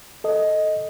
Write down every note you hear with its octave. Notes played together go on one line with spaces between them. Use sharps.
A4 D#5